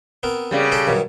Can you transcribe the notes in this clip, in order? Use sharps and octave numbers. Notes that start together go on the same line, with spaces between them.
B3 C4 A#4
C#3 G3
A4 C5 G5
G2 D#3 F#3